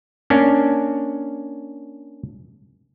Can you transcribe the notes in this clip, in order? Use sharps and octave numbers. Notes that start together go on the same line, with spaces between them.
A#3 C#4 D4